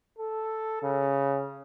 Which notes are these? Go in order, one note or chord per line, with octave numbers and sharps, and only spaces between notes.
A4
C#3